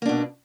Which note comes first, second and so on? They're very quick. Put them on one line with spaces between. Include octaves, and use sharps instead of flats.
A#3 D4 B2